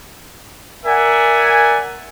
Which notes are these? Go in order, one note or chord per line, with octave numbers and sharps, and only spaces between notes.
A#4 D5 E5 F#5 G#5